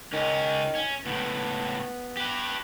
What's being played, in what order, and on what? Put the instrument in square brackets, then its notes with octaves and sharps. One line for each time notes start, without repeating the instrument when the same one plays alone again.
[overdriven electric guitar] C#2 C#4 [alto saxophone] D#3
[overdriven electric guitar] C#4
[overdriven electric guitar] C#2 A2 [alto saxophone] B3
[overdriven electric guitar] G4 B4